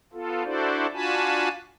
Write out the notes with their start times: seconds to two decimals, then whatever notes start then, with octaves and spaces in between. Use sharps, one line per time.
0.13 B3 F4 A4
0.44 D4 E4 F#4 A4 C5 D5
0.94 D4 F4 F#4 G#5 A5 B5